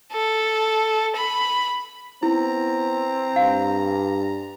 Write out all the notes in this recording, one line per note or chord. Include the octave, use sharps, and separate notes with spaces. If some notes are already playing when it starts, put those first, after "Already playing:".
A4
B5
B3 C4 E4 A#5
G2 F5